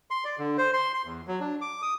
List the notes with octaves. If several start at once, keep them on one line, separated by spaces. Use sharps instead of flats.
C6
D5
D3
C5
C6
C6
E2
F#3
D4
D6
D#6